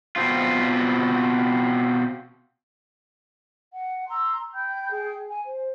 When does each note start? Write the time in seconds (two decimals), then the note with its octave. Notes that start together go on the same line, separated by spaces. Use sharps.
0.16 B2 C4 F4
3.74 F#5
4.09 A#5 C6 E6
4.53 G5 B5 G6
4.91 G#4 G5
5.27 G#5
5.45 C5